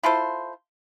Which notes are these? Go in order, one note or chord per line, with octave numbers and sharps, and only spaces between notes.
E4 F4 A4 C5